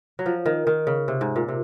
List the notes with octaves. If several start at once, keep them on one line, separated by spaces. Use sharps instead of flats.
F#3
F3
D#3
D#3
C#3
C3
G#2
A#2
C3